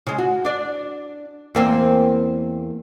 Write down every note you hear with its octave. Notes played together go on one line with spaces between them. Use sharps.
C#3 G#3
F#4
D4 D5
E2 A#3 C4